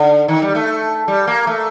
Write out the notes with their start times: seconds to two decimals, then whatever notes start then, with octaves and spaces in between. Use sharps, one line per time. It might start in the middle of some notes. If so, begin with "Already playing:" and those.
Already playing: D3
0.28 D#3
0.42 G3
0.55 A3
1.08 G3
1.27 A#3
1.47 A3